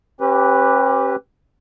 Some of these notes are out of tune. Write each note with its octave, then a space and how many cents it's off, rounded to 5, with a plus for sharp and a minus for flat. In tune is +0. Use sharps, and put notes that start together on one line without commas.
C#4 -45 G4 -10 B4 +0